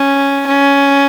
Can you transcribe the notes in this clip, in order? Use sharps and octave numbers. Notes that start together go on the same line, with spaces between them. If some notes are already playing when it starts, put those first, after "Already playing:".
Already playing: C#4
C#4